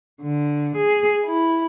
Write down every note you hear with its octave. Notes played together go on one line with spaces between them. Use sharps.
D3
G#4
E4